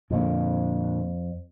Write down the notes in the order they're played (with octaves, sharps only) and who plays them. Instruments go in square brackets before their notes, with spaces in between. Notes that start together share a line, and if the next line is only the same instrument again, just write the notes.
[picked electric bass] F2 [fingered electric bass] A#2 D3 A#3